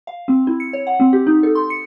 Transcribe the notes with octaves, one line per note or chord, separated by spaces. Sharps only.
F5
C4
E4
C#7
C#5
F#5
C4
G4
D#4
A4
C6
C#7